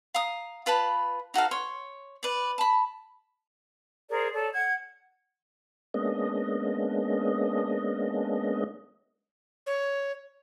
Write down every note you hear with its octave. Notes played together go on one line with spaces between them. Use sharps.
F5 A#5 D#6
F4 B4 A5 B5
D#4 F#4 A4 F5
C#5 C6
B4 D5
A5 B5
G#4 A#4 C5 D5
A4 C#5 D5
F#5 G#6
G#3 A#3 B3 C#4 D4 D#5
C#5